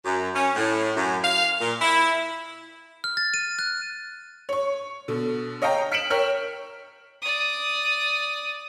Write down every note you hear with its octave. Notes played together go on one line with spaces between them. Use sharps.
F#2
C#4
A2
F#2
F5
A#2
E4
F6
A6
D#7
F#6
C#5 C#6
B2 D3
C#5 D#5 F5 G5 A#5
F6 B6 C#7 D7 E7 F#7
A#4 C#5 G5 F6
D5 D#6